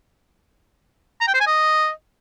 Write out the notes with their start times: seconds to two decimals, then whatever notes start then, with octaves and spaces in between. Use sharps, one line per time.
1.21 A#5
1.28 G5
1.34 C5
1.40 G#5
1.47 D#5